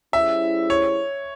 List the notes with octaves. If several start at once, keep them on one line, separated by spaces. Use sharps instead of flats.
G3 C#4 E4 G#4 C5 E5
C#5